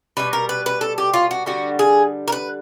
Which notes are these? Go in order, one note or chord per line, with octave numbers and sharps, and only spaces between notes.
B2 G3 B4
A#4
B4
B4
A4
G4
F4
F#4
D3 G3 F#4
G#4
A#4
B4